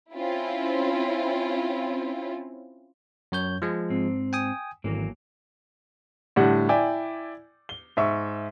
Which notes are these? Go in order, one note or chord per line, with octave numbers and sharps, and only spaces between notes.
C4 C#4 E4 F4
F#2 C#5 G6
F3 G#3
G#2 C4
G5 G#5 D#6
G#1 E3 F#3 A#3
A2 D3 G3 F#5
E4 D5 G5 G#5
G7
G#2 E5 C#6